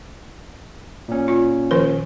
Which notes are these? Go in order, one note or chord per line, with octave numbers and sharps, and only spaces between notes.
A#2 C#4
F4
D#3 F3 A#4